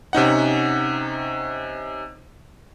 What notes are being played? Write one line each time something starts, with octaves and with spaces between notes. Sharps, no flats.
C3 C#4 D#4 F#5